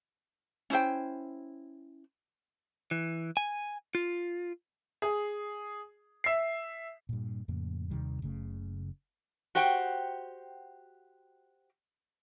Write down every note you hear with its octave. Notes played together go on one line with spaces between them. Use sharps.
C#4 E4 C5 G5
E3
G#5
F4
G#4
E5 C7
G2 A#2
F2 A2 C#3 A#3
D#2 C3 D#3 G3
F#1 C#3 A3
F#4 G4 C5 F#5 G5